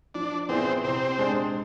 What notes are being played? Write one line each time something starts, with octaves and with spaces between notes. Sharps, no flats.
F3 D4
B3 C4 E4 G#4 D5
C3 C4
G#3 D4 G#4